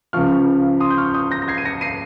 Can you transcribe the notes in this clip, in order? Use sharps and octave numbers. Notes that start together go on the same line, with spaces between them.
C#2 C#3 F3 C#6 F6
C6 D#6
G6
C#6 F6
D#6 G6
G6 A#6
A#6
G#6 C7
D#7
A#6 C#7
C7 D#7